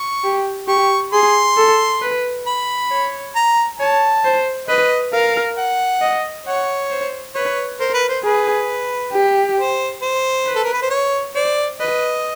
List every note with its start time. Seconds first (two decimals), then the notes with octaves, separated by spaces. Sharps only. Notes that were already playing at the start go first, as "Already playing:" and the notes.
Already playing: C#6
0.24 G4
0.68 G4 C#6
1.13 G#4 C6
1.57 A4
2.02 B4
2.46 B5
2.91 C#5
3.36 A#5
3.79 C#5 A5
4.24 C5
4.68 B4 D#5
5.13 A#4 F5
5.57 F#5
6.01 D#5
6.46 C#5 F#5
6.91 C5
7.35 B4 C#5
7.80 A#4 C5
7.94 B4
8.09 C5
8.24 G#4 B4
9.13 G4
9.58 C5
10.02 C5
10.46 B4
10.55 A4
10.64 A#4
10.73 B4
10.82 C5
10.90 C#5
11.35 C5 D5
11.79 B4 D#5